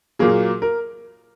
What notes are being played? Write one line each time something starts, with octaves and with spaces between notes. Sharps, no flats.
A#2 F#3 A#3 G#4
A#4